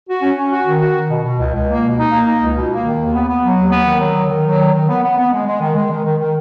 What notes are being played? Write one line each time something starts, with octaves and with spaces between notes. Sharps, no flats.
F#4
C#4
C#4
F#4
D#3
F#4
D#3
B2
B2
C#2
C#2
A#3
B2
D#4
A#3
D#4
C#2
B2
A#3
D#3
D#2
B3
B3
F#3
D#2
B3
D#3
F#3
D#3
D#3
F#3
D#3
D#3
B3
B3
B3
G#3
G#3
D#3
G#3
D#3
D#3
D#3